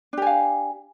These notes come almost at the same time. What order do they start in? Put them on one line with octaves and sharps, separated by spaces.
D4 G4 G#5 F5